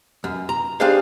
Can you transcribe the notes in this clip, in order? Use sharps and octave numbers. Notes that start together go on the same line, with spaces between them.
F#2
A#5
G3 D4 G#4 C5 F5